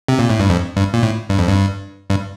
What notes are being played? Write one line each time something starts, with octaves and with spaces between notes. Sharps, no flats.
C3
A#2
A2
G2
F2
G2
A#2
A2
G2
F2
G2
G2